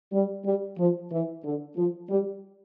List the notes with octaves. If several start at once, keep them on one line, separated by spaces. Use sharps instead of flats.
G3
G3
F3
E3
D3
F3
G3